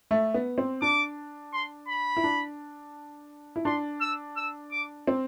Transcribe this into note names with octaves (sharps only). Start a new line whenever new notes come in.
A3
B3
C4
D4 D6
C6
B5
E4
D4
E4
D4 C6
E6
E6
D6
C4